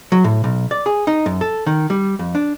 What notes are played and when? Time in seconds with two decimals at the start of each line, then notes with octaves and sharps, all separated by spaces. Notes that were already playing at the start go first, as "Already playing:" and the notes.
0.12 F#3
0.24 A2
0.44 B1
0.71 D5
0.86 G#4
1.07 D#4
1.26 F#2
1.41 A4
1.66 D#3
1.90 G3
2.19 F2
2.35 D4